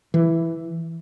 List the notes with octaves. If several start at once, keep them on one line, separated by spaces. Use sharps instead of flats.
E3